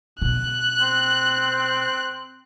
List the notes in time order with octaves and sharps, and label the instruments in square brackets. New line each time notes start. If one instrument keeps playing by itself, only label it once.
[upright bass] B2 [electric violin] F#6
[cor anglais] C4